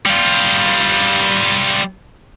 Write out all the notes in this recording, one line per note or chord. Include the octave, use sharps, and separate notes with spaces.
G3 F4